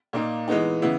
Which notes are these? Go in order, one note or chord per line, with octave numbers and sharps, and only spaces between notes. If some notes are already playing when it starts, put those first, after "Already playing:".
A#2 A#3 D#4
E3 G#3 B3 D#4
C#3 E3 B3 E4